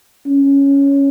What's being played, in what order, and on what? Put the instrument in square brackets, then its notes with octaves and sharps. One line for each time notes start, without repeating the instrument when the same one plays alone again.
[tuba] C#4